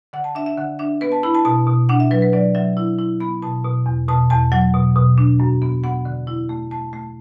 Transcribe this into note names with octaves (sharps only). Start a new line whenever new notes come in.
D3 F#5
A5
D4 E5
E5
D3 F#5
D4 E5
B3 B4
A5
E4 B5
A5
B2 A5
B2
D4 F#5
E5
F#3 B4
B4
F#3 D5
F#3 E5
E4
E4
B3 B5
B2 A5
B2
E2
B2 A5
E2 A5
F#3 F#5
B2
B2
D4
F#2
B3
B3 F#5
D3
E4
A3
A3 A5
A3